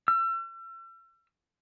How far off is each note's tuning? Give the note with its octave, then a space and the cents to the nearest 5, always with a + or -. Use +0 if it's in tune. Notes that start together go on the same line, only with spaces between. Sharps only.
E6 +40